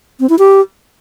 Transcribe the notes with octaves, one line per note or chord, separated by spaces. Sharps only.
C4
E4
G4